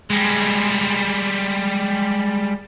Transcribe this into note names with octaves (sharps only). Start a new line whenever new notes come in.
G3 G#3